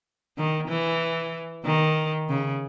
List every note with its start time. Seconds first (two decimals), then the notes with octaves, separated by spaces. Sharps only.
0.37 D#3
0.68 E3
1.65 D#3
2.29 C#3